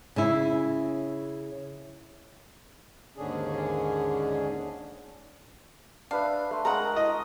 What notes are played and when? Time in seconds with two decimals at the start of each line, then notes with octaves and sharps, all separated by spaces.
0.16 C#3 C#4 E4
3.17 D#2 G#2 D3 C#4 D4 G#4
6.11 D4 B4 E5 F5
6.51 A3 C6
6.65 G#3 A#4 C#5 F#5 A#5
6.96 D#5